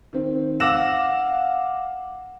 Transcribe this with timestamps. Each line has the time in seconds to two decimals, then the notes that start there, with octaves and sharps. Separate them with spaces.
0.13 D#3 C4
0.60 F5 F#5 D6 E6 A#6 E7